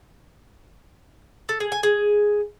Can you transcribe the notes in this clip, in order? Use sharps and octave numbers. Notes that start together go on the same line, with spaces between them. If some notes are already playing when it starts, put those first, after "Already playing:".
A4
G#4
G#5
G#4